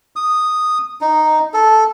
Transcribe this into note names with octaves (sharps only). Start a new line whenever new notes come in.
D#6
D#4
A4